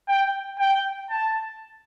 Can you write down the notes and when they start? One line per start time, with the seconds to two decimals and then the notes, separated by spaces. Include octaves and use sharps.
0.08 G5
0.59 G5
1.10 A5